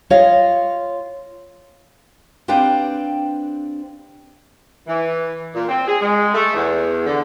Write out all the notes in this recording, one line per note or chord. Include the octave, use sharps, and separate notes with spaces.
F4 C#5 D#5 F5
C4 D4 G4 B4 F5 G5
E3
A#2
C4
G#4
G#3
A3
E2
D3